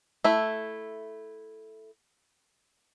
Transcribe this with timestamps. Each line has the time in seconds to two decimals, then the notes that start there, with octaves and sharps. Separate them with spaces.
0.24 A3 E4